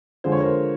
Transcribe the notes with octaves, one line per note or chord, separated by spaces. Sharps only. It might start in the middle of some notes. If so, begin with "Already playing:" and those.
D3 F3 G#3 C5
C#5
A#4 C5